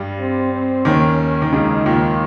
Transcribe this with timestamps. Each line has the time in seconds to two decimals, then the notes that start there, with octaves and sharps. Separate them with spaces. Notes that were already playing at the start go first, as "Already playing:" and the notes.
Already playing: G2 G3
0.19 C4
0.52 C4
0.85 D#2 D#3 C#4
1.42 D#3
1.52 C#2 C#3 D#4
1.85 D#2 D#3 F4